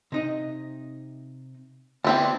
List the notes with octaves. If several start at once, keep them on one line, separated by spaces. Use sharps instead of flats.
C3 D#4 D#5
D2 E3 B3 C4 D4